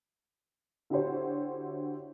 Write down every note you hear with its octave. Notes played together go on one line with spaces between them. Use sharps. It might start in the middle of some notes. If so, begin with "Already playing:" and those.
D3 E4 F#4 G4 C5 C#5